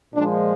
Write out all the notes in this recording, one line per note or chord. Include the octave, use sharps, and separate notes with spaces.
A#2 F3 G#3 D4